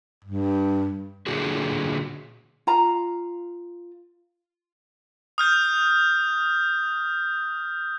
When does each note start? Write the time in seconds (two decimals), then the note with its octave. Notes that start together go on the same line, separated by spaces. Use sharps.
0.25 G2
1.27 A#2 D3 F#4 G#4
2.67 F4 A#5
5.38 D#6 F6 G6